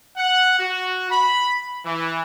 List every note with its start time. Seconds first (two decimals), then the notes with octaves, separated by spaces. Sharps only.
0.17 F#5
0.59 F#4
1.10 B5
1.85 E3